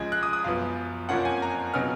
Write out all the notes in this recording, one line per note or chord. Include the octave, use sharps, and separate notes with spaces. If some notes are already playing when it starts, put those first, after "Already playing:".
Already playing: C#2 C#3 F3 G#3 G#6
F#6
D#6
D#6
F#2 F3 B3 F5
F2 F3 A#3 C#4 F4 F#5
G#5
A#5
C#3 F#3 B3 D#4 F6